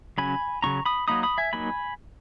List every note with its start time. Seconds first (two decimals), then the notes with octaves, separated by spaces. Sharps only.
0.18 C#3 F#3 C#4 G#5 B5
0.62 C#3 F#3 C#4 A#5 C#6
0.85 B5 D#6
1.08 F#3 A#3 D#4 B5 D#6
1.23 B5 D#6
1.38 E5 G#5
1.53 F#3 A#3 D#4 G#5 B5